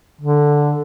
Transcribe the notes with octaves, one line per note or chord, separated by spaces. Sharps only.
D3